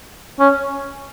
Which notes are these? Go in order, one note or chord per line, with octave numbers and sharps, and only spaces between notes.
C#4